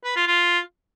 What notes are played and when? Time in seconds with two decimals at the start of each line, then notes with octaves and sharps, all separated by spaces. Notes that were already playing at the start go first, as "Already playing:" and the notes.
0.04 B4
0.16 F4
0.27 F4